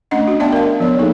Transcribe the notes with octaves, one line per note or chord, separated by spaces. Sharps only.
A3 C#4 D4 D#5 F#5
D4 F#4
B3 D4 D5 E5 G5 A5
A#4 F5
F3 B3 C#5 D5
A#3 D#4 G#4 A4